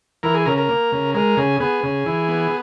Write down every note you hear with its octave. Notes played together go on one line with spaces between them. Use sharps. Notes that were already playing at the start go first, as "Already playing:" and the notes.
E3 A#4
G#4
C#3 A#4
A#4
A#3
C#3
G#3 A#4
C#3 G#4
B3 G#4
C#3
E3
B3